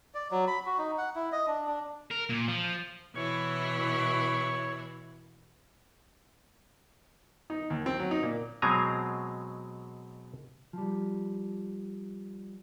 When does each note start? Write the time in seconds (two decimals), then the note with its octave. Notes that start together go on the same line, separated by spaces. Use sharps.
0.14 D5
0.31 F#3
0.48 B5
0.66 F#4
0.78 D#4
0.98 F#5
1.15 E4
1.32 D#5
1.47 D4
1.67 D4
2.11 A#4
2.30 A#2
2.48 F3
3.15 B2 E3 E4 C#5 C#6
7.50 D#4
7.70 D#2
7.86 C4
7.99 F#3
8.11 D#4
8.23 A#2
8.62 B2 F#3 G#3 C4 G#5 A#5
10.73 F3 G3